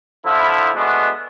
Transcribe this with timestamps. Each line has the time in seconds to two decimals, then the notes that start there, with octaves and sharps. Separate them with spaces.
0.24 D3 F3 E4
0.74 B2 G#3 A3 B3 D4